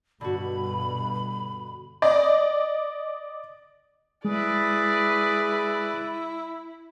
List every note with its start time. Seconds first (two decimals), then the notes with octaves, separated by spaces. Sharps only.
0.21 G2 B2 D3 F#4 B5
2.02 D5 D#5
4.25 G#3 E4 G#4 B4 D5